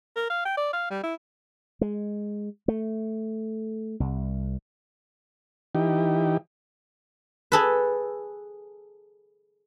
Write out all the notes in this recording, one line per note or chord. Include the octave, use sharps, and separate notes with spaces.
A#4
F5
G5
D5
F5
G3
E4
G#3
A3
C2
E3 D#4 G4
G#4 A4 B4